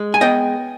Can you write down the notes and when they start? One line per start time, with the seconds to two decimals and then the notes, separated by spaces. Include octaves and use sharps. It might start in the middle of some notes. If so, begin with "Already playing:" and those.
Already playing: G#3
0.14 G#5
0.21 B3 D#5 G5